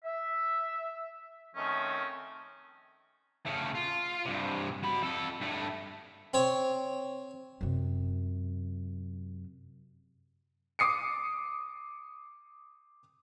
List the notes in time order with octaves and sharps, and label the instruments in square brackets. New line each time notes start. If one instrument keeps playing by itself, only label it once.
[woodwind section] E5
D#3 F3 A3 C4 C#4
[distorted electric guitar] C#3 A3
F4
G2 C3
F#3 B5
F2 A4
G2 A3
[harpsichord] C4 C#5
[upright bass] F#2 C3
[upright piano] D6 D#6 C7 C#7